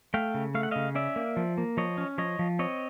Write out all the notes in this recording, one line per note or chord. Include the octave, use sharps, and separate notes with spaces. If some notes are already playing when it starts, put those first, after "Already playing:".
A3 F5 G5
C#3
A3 F5
F#5
C#3 D#5 F5
C#4 D5 E5
A#3
F3
A#3
F3 C#5 D#5
C#4
F3 C#5 D#5
F3
C4 C#5 D#5